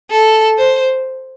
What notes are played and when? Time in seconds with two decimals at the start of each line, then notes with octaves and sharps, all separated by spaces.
0.10 A4
0.58 C5